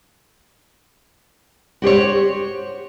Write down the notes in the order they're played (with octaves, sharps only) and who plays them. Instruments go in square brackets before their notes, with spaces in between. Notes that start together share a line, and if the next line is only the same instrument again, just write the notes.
[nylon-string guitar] F#4 G4 C5 C#5